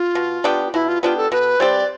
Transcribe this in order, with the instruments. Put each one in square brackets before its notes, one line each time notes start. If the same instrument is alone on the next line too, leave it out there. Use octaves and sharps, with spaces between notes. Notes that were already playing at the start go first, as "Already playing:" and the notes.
Already playing: [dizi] F4
[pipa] B2
B3 D4 G4
[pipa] B2 [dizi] E4
[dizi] F4
[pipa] B3 D4 G4 [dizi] F4
[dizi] A4
[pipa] B2 [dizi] B4
[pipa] G3 C4 G4 [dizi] D5